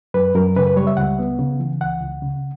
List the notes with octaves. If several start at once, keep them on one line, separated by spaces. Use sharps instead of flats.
F#2 B4
F#2 A#4
C#3 B4
B4
G3 C#5
E5
C#2 F#5
B3
C#3
E3
C#2 F#5
C#2
C#3